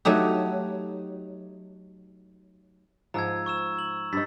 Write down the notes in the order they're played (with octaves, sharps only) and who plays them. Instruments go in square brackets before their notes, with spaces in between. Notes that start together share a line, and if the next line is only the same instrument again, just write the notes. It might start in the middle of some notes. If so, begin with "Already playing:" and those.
[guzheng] F#3 A3 D#4 G4
[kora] G#2 F3 [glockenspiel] A#5 E6 G#6
[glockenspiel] C#6 E6 E7
F#7
[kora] G2 D#4 [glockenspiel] E6 A6 B6